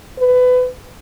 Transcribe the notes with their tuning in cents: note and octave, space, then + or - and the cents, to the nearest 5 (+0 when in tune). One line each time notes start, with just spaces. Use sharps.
B4 +25